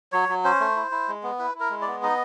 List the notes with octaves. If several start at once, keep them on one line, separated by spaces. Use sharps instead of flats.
F#3 C#5
F#3
C#4 C5
A3
E4
E4
G#3
B3
E4 B4
E4
A#4
G#3
D5
B3
D#4 D#5